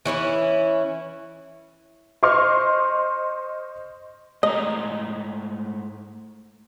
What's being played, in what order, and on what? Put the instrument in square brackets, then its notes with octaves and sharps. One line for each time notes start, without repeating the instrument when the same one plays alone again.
[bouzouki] E3 C#4 D#4 E4
[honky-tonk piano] C5 D#5 C6 C#6 F6
[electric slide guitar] G#2 A3 A#5 [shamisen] D#5